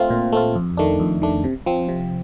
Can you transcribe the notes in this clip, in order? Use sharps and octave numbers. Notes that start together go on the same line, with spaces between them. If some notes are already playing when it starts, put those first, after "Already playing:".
Already playing: A3 C4 F4
A#2
A3 C4 F4
F2
D#3 A3 D4
F2
D#3 A3 D4
C3
F3 C4
C3